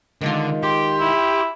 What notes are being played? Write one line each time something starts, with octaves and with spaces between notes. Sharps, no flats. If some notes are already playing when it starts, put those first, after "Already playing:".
D3 D#3 G#3 F4
G4 C6
E4